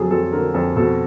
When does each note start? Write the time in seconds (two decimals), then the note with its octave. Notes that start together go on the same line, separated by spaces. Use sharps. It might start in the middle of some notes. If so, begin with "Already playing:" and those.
Already playing: F2 D3 F#3 G#4 A4
0.11 F2 A4
0.32 D3 A#4
0.54 F2 A4
0.76 B2 A4